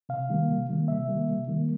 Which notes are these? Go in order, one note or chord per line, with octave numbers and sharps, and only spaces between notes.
C3 F5
D#3 G3 A#3
C3
D#3 G3 A#3
C3 E5
D#3 G3 A#3
C3
D#3 G3 A#3